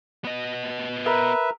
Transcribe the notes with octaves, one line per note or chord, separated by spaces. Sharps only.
B3 D#5
A#4 B4 E5